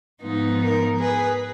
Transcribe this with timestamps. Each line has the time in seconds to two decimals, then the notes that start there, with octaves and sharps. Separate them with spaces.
0.21 G#2 F3 B3 D#4
0.60 A#4
0.99 G#4 B4